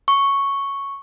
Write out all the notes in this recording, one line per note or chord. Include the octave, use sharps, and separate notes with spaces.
C#6